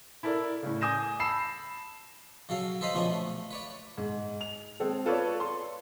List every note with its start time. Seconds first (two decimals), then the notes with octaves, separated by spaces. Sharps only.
0.23 E4 A4 A#4 D5
0.63 A2 C#3
0.81 G#5 D6 D#6 G6 A#6 E7
1.19 A5 B5 E6 C7 E7
2.49 C#3 F#3 A4 F5
2.81 A4 B4 C5 D#5 F5 B5
2.94 A#2 C#3 F3 B3 C#4 D4
3.10 A3
3.51 B4 C#5 D5
3.98 G#2
4.41 F7
4.80 G#3 C4 A4
5.05 F4 A4 B4 C#5 D5
5.40 C6